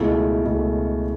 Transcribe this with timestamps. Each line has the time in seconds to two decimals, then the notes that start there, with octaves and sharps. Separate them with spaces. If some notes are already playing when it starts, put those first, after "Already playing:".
Already playing: C#2 B2 A3 E4 A4
0.45 C#2 B2 A3 E4 A4